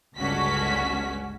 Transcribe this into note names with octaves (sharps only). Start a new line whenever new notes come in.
G1 C#2 C#4 D4 F#4 B6